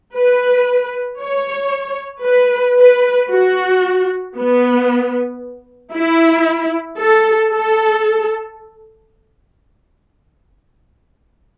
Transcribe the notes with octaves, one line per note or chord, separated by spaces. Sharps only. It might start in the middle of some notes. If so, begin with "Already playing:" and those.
B4
C#5
B4
B4
F#4
B3
E4
A4
A4